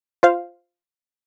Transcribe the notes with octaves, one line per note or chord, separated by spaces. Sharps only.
F4 C5 F5